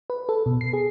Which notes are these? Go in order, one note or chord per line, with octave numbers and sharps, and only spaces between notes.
B4
A4
B2
C7
G#4